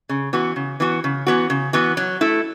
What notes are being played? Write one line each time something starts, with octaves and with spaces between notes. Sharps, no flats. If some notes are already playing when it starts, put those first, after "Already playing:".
C#3
E3 B3 F#4
C#3
E3 B3 F#4
C#3
E3 B3 F#4
C#3
E3 B3 F#4
F#3
A3 E4